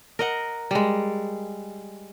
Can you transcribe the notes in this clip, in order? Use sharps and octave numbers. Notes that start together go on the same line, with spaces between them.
A#4 D#5 F#5
G3 G#3